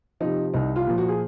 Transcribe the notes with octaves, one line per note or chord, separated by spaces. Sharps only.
C3 F3 D#4
C2 D#4
F4
A#2 F3
F#4
G#4